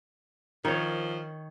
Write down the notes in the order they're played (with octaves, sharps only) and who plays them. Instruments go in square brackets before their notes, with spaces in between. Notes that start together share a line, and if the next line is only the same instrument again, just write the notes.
[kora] D#3 C#5 [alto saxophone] F3